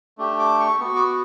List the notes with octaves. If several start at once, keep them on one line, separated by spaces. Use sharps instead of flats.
A3 D4 G4
D6
C#6
B3 F#4 C#6
D6
C#6